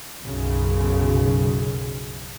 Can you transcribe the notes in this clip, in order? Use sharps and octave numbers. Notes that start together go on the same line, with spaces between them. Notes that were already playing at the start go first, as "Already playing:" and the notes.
B1 F#2 C#3